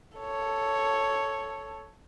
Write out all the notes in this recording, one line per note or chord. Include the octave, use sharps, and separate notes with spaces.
A4 C#5